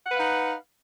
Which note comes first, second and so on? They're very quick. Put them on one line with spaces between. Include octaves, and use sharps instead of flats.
F#5 B4 F5 D#4